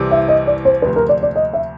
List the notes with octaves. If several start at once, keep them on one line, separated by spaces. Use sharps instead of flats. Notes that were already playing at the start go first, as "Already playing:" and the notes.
Already playing: C2 C3 E3 G3
E5
D#5
D5
C5
D2 C3 F3 B4
A#4
D5
D5
D#5
E5